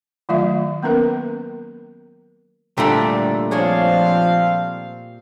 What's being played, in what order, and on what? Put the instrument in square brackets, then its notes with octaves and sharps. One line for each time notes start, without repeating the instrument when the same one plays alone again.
[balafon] D#3 F#3 A3 F4 E5
A#3 B3 C#4 A#4 B4
[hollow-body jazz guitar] A#2 G3 A3 [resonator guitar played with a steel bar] D3
[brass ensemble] F3 C4 F5 [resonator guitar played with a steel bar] D4 G#4 C#5